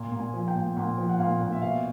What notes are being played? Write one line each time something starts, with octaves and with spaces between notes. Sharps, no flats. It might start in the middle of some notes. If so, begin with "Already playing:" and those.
Already playing: A#2
A#2
G#5
F3
G5
A#2
A#2 F#5
F3
F#5
A#2 F5
A#2
E5
B2 F5